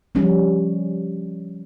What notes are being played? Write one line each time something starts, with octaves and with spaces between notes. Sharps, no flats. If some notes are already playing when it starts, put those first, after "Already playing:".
F3 G3 C#4